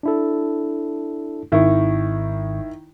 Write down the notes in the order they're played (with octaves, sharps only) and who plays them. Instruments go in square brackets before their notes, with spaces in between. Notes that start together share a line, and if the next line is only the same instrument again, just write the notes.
[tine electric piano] D4 E4 A4
[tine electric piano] G#1 C#6 [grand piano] D#3 E4